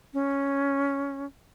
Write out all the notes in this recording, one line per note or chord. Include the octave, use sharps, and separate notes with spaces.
C#4